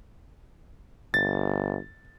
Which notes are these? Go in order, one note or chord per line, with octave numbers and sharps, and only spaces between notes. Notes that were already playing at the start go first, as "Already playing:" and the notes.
G1 A6